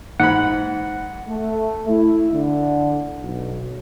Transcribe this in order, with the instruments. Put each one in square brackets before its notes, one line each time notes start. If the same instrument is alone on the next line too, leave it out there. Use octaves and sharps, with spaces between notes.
[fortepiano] G#2 B5 [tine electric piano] F#5
[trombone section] A3
E4
D3
B1